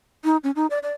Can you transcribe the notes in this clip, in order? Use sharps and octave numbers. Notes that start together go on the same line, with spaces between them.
D#4
C#4
D#4
D5
D5